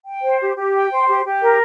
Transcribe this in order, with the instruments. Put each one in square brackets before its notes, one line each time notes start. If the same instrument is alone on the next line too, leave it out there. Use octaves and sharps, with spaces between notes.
[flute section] G5
C5
G4
G4
G5
C5
G4
G4
A#4